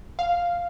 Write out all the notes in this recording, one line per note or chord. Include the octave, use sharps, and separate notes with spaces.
F5